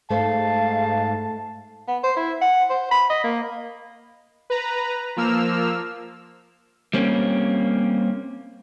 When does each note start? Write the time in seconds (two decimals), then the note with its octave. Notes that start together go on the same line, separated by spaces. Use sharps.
0.10 G#2 A3 C5 F5 A5
1.88 B3
2.03 C5
2.16 E4
2.41 F#5
2.70 C5
2.91 B5
3.10 D#5
3.24 A#3
4.50 B4 A#5
5.16 F3 A#3 E6 F6
6.94 G3 A#3 C4 C#4